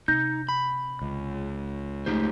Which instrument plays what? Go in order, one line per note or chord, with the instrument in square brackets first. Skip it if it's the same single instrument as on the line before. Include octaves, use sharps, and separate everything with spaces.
[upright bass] C3 [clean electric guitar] D#4 [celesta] G6 A#6
[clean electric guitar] B5
[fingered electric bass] C#2
[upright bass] A3 [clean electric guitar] D#4 G4 C5